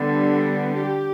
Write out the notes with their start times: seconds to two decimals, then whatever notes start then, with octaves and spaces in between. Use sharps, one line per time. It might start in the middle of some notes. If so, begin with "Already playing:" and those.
Already playing: D3 G3 B3
0.82 G4